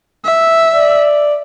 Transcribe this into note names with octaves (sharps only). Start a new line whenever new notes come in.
E5
D5